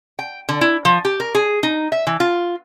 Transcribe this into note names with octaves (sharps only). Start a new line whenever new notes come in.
G5
D3
E4
F3
G4
A#4
G#4
D#4
E5
E3
F4